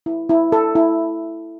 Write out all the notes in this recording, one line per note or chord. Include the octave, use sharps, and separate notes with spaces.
E4
E4
A4
E4